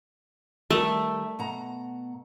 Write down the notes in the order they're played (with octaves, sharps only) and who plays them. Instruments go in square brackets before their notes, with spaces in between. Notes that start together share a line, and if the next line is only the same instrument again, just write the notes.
[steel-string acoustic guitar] D#3 G3 E5 [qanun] A3
[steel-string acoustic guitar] B2 F#5 A#5